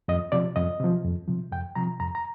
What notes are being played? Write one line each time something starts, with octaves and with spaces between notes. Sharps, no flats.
F2 D#5
C3 F3 D5
F2 D#5
C3 F3
F2
C3 F3
F2 G5
C3 F3 A#5
F2 A#5
A#5